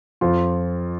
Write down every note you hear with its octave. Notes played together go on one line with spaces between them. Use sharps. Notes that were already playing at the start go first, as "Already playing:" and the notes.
F2 F4